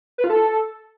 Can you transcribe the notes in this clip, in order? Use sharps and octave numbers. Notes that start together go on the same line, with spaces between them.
B4
F4
A4